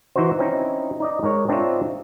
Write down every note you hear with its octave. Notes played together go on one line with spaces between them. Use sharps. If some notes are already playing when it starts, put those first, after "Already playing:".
E3 D#4 E4 F#4 C5
C4 C#4 D#4 E4
D#4 D5 D#5
G#2 A#4 C#5
C4 D4 D#4 F4 C#5 E5